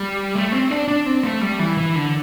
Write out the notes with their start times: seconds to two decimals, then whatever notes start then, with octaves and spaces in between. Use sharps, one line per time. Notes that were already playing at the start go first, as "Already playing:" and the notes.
Already playing: G3
0.35 A3
0.52 C4
0.70 D4
0.88 D4
1.06 C4
1.23 A3
1.41 G3
1.59 E3
1.77 E3
1.95 D3